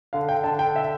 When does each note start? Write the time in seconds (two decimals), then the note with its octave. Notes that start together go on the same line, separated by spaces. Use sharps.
0.13 D3 F5
0.29 G5
0.44 D3 A5
0.59 G5
0.76 E5